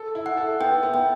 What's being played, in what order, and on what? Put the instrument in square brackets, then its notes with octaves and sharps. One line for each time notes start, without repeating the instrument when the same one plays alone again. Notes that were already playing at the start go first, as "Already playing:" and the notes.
Already playing: [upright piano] A4
E4
[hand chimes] F#5
[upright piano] A4
[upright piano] B3 [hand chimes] G5
[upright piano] B3
[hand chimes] G5